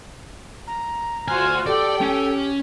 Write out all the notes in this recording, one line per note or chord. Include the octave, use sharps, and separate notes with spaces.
A#5
D2 F4 F#4 C5 G#5 F6 F#6
G4 A4 D5 G5
C#4